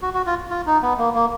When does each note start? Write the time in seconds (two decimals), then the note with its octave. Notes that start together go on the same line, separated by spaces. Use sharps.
0.02 F#4
0.14 F#4
0.26 F4
0.50 F4
0.66 D#4
0.82 B3
0.98 A#3
1.14 A#3